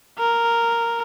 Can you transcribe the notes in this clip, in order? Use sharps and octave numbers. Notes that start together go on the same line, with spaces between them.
A#4